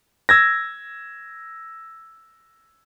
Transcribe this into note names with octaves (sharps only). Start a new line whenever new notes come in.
E6 G#6 A#6